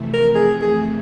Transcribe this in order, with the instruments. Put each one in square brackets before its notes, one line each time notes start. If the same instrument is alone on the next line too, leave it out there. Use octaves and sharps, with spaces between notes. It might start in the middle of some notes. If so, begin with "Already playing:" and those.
Already playing: [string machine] F2 C3 E3 A3
[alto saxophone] A#4
G#4
G#4